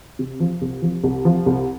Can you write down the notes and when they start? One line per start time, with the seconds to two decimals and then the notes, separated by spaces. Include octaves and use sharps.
0.19 C3
0.40 F3
0.62 C2
0.82 F3
1.04 C2
1.25 F3
1.46 C2